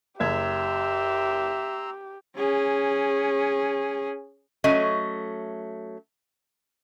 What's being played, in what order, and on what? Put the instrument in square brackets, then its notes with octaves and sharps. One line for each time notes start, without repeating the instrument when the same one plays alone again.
[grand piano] F#1 G#6 [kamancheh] G4 [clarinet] E5 [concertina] A#5 C6 E6
[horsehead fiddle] C#4 G#4
[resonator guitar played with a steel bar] F#3 A3 C#4 D#5